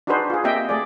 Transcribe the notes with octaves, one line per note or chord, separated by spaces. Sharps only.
D4 D#4 F#4 G#4 B4 C5
F4 G#4
A#3 C4 G4 D#5 E5 G5
A3 G#4 D5